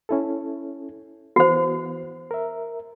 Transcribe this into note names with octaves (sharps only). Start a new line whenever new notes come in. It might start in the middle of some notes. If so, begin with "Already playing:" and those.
C#4 E4 A4
E3 B3 F#4 C5
A#4 E5